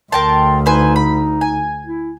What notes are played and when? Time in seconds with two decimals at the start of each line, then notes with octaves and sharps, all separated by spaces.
0.12 D2 A#4 G5 A5 C6
0.66 D#4 B4 C5 G#5
0.96 B5
1.41 G#5
1.85 E4